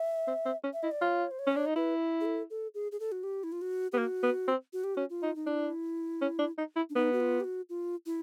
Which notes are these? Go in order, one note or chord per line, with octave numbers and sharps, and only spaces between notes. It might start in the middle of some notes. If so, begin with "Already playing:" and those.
Already playing: E5
C4
C4
C#4
E5
E4 D#5
D5
F4 C#5
C5
C#5
C#4
D4
D#4
E4 B4
G#4
A4
A4
G#4
G#4
A4
F#4
G4
E4
F4
F#4
B3 G4
A#3 F#4
B3
C4
F#4
G4
C#4 F#4
F4
D#4
D#4
D4 E4
C#4
D4
D#4
E4
D4
B3 D#4
F#4
F4
G4
F#4
F4
E4